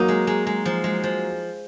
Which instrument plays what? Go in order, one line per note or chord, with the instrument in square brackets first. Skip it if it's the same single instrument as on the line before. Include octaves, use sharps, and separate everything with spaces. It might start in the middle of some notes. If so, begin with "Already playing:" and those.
Already playing: [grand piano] F#3 A#3 [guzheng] D#4
[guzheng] G#3
G#3
G#3
F3
G#3
F3